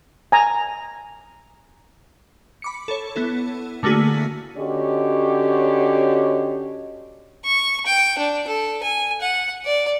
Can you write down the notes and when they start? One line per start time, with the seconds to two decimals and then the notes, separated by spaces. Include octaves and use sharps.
0.32 G#5 A#5
2.62 B5 D6 C#7
2.88 A4 C#5
3.16 B3 E4 A4
3.83 D3 A3 A#3 F#4 G#4 B6
4.57 D3 C#4 F#4 G4 C#5 D#5
7.45 C#6
7.86 G5
8.18 D4
8.47 A4
8.83 G#5
9.21 F#5
9.65 D5